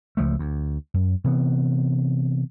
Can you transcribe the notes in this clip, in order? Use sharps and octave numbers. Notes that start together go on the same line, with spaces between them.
C#2 F3 A3
D2
F#2
C3 E3 B3